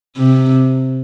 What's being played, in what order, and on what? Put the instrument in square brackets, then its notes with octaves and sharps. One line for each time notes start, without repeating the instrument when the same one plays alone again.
[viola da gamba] C3